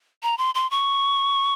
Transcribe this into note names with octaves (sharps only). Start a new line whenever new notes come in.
A#5
C6
C6
C#6